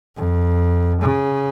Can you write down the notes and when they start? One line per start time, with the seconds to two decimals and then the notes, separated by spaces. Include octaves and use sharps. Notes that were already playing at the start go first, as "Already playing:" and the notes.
0.16 F2
1.01 C#3